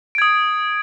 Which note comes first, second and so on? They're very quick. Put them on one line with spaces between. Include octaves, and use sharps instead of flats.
D7 G#6 D#6